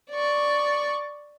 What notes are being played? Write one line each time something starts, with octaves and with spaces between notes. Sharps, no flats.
D5 C#6